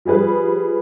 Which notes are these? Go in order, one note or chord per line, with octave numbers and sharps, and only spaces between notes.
F3 G3 G#4 B4